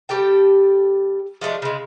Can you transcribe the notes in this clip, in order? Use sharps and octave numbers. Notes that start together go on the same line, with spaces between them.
G3 G4 A4 G5
F3 G#3 A3 D4
C#3 G#3